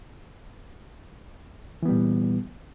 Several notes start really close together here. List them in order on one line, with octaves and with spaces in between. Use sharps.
E3 B3 G3 A#2